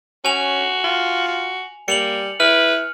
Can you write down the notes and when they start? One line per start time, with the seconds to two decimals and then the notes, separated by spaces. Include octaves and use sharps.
0.25 C#4 F#4 G#5 F7
0.84 F4
1.28 F#4
1.88 G3 A#3 C#7 F7 F#7
2.40 E4 B4 F6